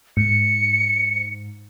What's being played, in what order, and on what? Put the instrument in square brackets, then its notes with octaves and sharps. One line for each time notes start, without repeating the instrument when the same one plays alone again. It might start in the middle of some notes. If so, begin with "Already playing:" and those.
[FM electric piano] G#2 [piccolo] C#7